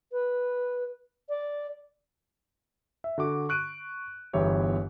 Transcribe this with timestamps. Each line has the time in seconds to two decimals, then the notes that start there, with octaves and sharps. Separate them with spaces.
0.12 B4
1.29 D5
3.04 E5
3.18 D3 F#4 D6
3.49 C#6 F#6 D7 D#7
4.33 G1 E2 E3 G4 C#5 E5